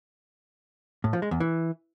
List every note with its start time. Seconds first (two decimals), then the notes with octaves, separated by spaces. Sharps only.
1.04 A2
1.13 F3
1.22 G#3
1.31 E2
1.40 E3